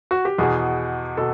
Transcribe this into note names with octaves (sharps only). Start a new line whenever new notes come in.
F#4
G4
E2 B2 G#4
B2 A4